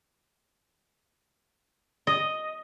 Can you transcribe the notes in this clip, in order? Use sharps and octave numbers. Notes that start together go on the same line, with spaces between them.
D#5